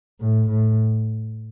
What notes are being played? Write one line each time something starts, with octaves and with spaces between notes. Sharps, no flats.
A2
A2